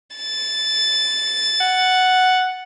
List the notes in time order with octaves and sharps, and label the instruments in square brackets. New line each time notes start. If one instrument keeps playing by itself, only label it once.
[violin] A6
[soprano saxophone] F#5